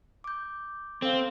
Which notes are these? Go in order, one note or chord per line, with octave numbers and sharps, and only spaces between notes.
D6 G6
C4 A4 F5